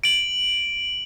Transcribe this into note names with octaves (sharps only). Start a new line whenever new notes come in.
D7 F#7